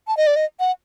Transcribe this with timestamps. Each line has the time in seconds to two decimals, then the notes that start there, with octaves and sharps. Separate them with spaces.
0.08 A5
0.17 D#5
0.27 D5
0.36 D#5
0.60 F#5